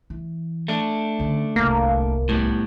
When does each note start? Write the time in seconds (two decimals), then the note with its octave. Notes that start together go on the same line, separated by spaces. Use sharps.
0.10 E3
0.68 A3 D4
1.19 D3 C#4
1.56 D1 C2 A#3
2.29 A2 G3 B3